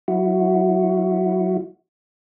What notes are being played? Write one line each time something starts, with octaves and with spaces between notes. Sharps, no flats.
F#3 E4 F#4